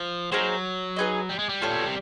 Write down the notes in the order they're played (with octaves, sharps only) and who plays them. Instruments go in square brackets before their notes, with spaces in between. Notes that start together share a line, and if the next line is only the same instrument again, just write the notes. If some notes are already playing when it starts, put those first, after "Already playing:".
Already playing: [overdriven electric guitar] F3
[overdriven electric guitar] F#3 [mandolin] A#3 D#4 G#4 C5
[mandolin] D#4 G#4 B4 D#5
[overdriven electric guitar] G3
G#3
G3
[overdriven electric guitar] A2 [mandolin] F4 A4 C#5
[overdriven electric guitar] A#2
B2
C3